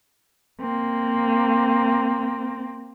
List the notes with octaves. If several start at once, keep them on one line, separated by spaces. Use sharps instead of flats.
A#3 C4